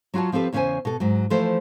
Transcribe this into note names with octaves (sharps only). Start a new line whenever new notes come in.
F#3 F4 F#4 C#5 A5
F3 C4 G4 A4 B4
E2 C#3 C#4 G4 C5 G#5
B2 A4
G#2 F#3
E3 F3 A3 A4 C5